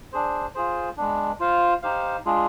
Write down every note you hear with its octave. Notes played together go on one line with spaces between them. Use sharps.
D4 G#4 C5
F4 G#4 C5
G#3 B3 D4
F4 C5 F5
D#4 G4 C5 F5
G#3 D4 F4 G#4